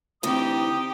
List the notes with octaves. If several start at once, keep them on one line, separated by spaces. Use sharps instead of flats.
D2 E3 C4 D#4 G4 D#6